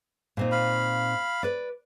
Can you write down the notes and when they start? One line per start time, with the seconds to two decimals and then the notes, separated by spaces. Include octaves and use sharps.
0.37 A#2 C4 D#4
0.52 F5 B5
1.43 B4 D5